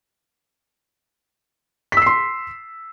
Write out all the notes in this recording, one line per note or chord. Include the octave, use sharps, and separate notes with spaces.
C6 E6 B6 C7